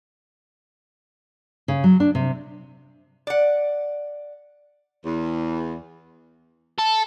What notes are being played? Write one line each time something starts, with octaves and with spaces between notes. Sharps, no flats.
C#3
F#3
D4
C3
D5 F#5
E2
A4